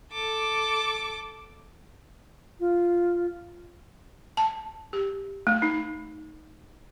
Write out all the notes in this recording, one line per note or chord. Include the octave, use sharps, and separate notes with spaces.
A4 D6
F4
A5
G4
A3
D#4